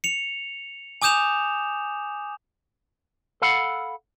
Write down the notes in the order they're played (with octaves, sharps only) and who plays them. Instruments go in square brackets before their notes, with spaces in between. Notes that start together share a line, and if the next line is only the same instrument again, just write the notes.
[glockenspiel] C#7 F7
G#5 D6 D#6 G6 E7 F7
[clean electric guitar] A4 F5 F#5 B5